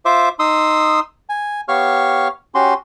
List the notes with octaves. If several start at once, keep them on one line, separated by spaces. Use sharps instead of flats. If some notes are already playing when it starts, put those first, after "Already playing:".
F4 C5 E5 D6
D#4 C6 D#6 E6
G#5
B3 G4 C#5 F5 C#6 F6
C#4 F#4 G4 C6